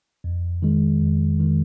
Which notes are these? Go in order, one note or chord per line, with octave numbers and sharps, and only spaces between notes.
F2
D#3 G#3
F2
D#3 G#3